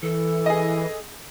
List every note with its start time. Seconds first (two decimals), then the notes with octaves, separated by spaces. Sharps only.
0.02 E3 A4
0.46 G#4 D#5